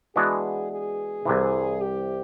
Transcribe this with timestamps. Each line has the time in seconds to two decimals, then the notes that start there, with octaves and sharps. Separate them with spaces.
0.16 E3 G#3 B3 D4 F#4 G#4
0.71 G#4
1.25 C2 C3 E3
1.81 G4